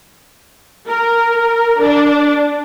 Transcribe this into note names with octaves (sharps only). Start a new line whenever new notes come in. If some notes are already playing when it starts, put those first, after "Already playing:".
A#4
D4